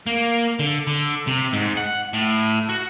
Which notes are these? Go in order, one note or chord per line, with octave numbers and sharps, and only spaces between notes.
A#3
D3
D3
C3
G#2
F#5
A2
F#4